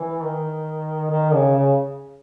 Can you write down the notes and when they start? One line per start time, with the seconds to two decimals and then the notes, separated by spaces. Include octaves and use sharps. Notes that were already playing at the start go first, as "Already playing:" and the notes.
Already playing: E3
0.23 D#3
1.11 D#3
1.33 C#3
1.55 C#3